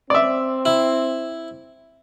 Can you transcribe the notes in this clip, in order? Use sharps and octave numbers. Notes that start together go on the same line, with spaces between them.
C4 D5 E5
E4